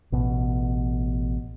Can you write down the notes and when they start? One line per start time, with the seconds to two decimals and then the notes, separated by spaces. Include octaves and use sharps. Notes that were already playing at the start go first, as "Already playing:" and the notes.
0.12 A1 B2